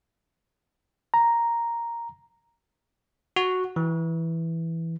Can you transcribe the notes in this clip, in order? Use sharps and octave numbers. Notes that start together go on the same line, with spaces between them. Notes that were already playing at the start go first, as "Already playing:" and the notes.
A#5
F#4
E3